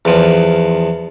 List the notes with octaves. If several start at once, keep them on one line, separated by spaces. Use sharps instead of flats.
E2 F3